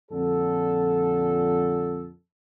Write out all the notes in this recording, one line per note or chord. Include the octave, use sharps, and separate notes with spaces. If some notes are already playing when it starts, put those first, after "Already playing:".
F2 A#2 D3 A4